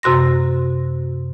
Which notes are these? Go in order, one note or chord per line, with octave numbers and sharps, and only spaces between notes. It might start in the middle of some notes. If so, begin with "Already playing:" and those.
F#2 C3 F#4 C6 A#6